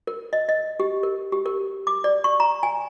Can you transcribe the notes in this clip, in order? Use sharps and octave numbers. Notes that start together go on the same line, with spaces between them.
A#4
D#5
D#5
G4
A#4
G4
A#4
D6
D5
C#6
A#5
G#5